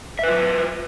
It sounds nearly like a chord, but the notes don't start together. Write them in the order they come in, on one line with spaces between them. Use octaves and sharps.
E5 B4 F4